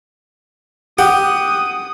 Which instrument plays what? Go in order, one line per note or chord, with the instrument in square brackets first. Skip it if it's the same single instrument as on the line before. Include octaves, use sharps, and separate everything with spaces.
[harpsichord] G4 [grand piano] F#5 [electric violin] D#6